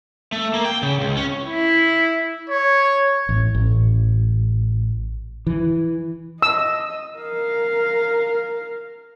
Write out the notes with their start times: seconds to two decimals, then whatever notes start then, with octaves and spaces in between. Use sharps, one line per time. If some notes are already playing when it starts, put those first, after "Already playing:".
0.32 A3
0.54 A#3
0.65 G5
0.83 C#3
1.01 C#2
1.17 C#4
1.45 E4
2.50 C#5
3.29 A1
3.55 A1
5.47 E3
6.42 D#5 E6
7.19 A#4 F5